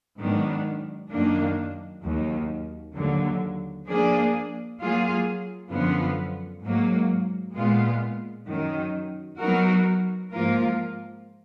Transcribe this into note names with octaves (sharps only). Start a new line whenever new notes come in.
G#2 D#3 F#3 B3 D4
F#2 D#3 A#3 D4
D#2 D#3 F#3
D#2 D3 F#3
F3 A#3 D4 G#4 D5
F#3 A#3 F4 G#4
F#2 D3 F3 B3 F4
G#2 F#3 A#3
A#2 G#3 B3 F4
F#2 D#3 F#3
F#3 B3 D#4 F#4 A#4
G#2 F3 A#3 F4 A#4